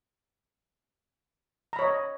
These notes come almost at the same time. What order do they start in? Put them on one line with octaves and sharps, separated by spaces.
A#5 B5 C#5 D#5